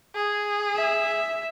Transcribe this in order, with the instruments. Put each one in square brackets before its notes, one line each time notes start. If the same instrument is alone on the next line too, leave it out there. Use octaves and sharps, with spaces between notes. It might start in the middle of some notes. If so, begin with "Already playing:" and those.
[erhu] G#4
[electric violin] E5